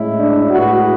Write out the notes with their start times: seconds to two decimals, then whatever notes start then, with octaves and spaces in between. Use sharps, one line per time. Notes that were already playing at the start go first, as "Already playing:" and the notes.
Already playing: A2 G#3 C#4 E4
0.20 D4
0.50 A2 G#3 D4 F#4 G#4 B4